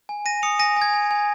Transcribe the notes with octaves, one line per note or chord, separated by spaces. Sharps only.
G#5
G#5 A#6 D#7
D#6 C#7 F7
G#5 A#6 D#7
G#5
G#6
G#5
G#5